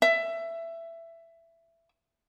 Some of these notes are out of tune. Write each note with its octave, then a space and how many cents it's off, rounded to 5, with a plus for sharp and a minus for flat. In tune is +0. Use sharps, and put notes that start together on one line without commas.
E5 +15